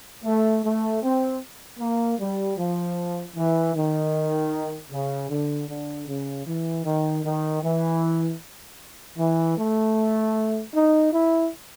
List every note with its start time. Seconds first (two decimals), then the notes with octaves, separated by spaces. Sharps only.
0.24 A3
0.64 A3
1.03 C4
1.80 A#3
2.19 G3
2.57 F3
3.36 E3
3.74 D#3
4.92 C#3
5.30 D3
5.69 D3
6.08 C#3
6.47 E3
6.85 D#3
7.25 D#3
7.63 E3
9.18 E3
9.58 A3
10.74 D#4
11.13 E4